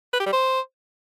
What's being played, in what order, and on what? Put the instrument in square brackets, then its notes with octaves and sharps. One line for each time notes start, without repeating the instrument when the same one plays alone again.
[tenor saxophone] B4
G4
G3
C5